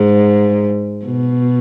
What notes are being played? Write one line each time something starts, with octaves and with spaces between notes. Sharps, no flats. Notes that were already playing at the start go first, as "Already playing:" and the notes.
Already playing: G#2
B2